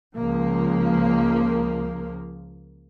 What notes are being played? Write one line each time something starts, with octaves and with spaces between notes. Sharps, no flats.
C#2 F3 A#3